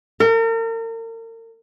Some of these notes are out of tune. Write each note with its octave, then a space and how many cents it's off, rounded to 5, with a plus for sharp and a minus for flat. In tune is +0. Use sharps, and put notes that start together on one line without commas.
A#4 -40